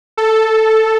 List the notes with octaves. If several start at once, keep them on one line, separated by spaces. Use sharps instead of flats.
A4